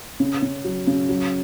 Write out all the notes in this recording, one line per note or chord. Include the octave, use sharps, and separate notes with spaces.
C#3
C#3
F#3
C#3
F#3